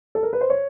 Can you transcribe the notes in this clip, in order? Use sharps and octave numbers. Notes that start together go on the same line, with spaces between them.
A4
A#4
B4
C5
C#5